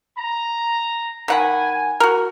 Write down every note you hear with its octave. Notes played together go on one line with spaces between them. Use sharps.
A#5
D#3 F#5 G#5 B5
F#4 A#4